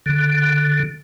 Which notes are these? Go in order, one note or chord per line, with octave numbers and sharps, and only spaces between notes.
D3